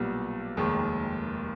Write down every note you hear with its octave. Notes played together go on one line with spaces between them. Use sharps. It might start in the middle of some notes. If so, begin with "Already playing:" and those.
Already playing: B1 A#2 G3 B3
F1 D#2 D#3 G#3